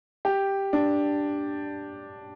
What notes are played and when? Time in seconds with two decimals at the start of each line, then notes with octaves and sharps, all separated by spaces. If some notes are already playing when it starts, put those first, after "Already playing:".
0.25 G4
0.73 D4